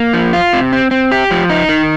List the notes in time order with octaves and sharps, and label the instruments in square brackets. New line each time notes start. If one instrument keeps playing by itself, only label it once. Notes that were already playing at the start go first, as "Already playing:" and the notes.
Already playing: [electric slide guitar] A#3
F3
F4
C3
C4
C4
G4
F3
D#4
D#3